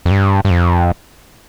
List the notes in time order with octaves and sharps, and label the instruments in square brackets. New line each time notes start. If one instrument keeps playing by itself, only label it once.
[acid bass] F2
G2
G2
F2